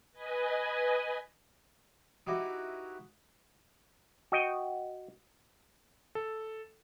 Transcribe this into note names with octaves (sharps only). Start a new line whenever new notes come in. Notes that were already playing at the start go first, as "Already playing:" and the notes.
B4 D#5 G#5
D#4 E4 F#4 G4 B4
F#4 D#5 G5
A4